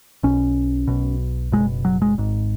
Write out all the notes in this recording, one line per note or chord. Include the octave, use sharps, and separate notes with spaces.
B1 B2 C#4
B1 B2
F#1 E2 B2 G#3
F#3
G#3
G#1 G#2